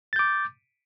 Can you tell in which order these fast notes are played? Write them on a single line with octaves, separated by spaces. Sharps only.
A6 G6 D6